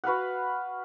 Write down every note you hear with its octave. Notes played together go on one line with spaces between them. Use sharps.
F#4 B4 F5 F#5